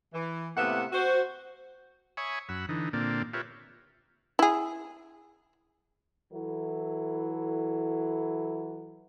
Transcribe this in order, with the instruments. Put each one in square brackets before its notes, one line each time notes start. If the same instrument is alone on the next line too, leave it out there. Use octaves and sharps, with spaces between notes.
[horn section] E3
A2 C3 A#3 B3 E5 F#5
F#4 C5
[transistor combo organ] C#5 E5 G#5 B5 C#6 D#6
F#2 F#5 B5 E6
D3 E3 D#4
A#2 D3 A#3 C4 D5
F4 G4 A#4 B4 C#5 E5
[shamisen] E4 G#4
[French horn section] E3 F#3 E4 A4